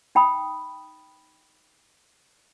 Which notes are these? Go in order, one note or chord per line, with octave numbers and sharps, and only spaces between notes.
D#4 G5 B5 D#6